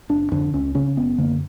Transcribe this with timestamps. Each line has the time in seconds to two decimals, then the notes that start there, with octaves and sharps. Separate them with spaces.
0.09 F#1 D4
0.32 F2 D3 D4
0.53 C#2 C#4
0.75 C#3 C#4
0.97 F#1 B3
1.18 F#2 D3 A#3